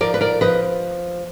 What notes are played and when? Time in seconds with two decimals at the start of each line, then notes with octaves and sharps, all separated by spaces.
0.01 F3 A#4 D5
0.14 B4
0.21 A#4 D5
0.41 F3 B4 D#5